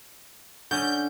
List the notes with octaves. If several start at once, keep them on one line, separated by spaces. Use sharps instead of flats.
D3 C#4 G6